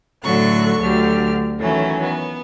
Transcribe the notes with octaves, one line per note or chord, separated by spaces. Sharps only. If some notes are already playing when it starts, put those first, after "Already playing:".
A2 D3 F#3 A4 C#6 F#6
D2 D3 F#3 G4 F6
D#3 E3 F#3 A3 C#4
B3